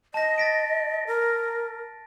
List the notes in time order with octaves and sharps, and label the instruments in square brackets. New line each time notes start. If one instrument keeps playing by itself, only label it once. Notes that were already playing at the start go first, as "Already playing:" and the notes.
[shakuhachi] D#5 [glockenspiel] A5 A#6
[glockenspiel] A6 B6 D7
[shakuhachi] A#4